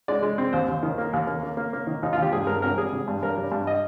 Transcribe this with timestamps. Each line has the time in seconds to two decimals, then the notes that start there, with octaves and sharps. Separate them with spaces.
0.08 G#3 D5
0.23 G#3
0.38 C4
0.53 D#2 C5
0.68 D#2
0.83 D#3
0.98 A#3
1.13 D#2
1.27 A#3
1.43 A#3
1.57 A#3
1.73 A#3
1.87 D#3
2.03 D#2 D#4
2.13 D#2 F4
2.22 G4
2.33 G2 G#4
2.47 G2 A#4
2.62 G#1 A#4
2.77 G3 G#4
2.93 G#1
3.08 G2
3.23 G2 A#4
3.38 G3
3.52 G2
3.67 D#5